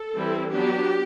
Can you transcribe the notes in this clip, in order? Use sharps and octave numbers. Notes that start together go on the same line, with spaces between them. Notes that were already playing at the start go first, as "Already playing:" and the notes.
Already playing: A4
E3 G3 C4 E4
F#3 B3 D4 G4